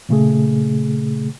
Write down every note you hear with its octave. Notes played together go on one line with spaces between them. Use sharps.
A#2 C#3 A3 G#4